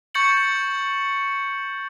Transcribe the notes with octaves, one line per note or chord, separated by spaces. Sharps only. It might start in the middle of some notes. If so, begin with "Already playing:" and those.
C#6 G6 A6 C#7 F#7